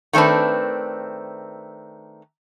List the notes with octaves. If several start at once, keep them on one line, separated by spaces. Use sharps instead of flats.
D#3 A3 C4 D4 B4